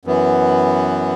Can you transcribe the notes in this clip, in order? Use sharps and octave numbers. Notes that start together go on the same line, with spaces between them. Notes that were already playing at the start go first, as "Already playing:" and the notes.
F#2 E3 B3